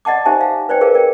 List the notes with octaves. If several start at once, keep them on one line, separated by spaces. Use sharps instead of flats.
D5 D#5 F#5 A5 D6
D#4 G4 C5 E5 G#5 A5
F5 F#5
B4 C5 D5 G5
G#4 A#4 B4 F5
A#4 D5 G5